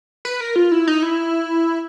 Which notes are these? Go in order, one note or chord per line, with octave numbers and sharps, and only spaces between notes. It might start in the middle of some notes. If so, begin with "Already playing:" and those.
B4
A#4
F4
E4
D#4
E4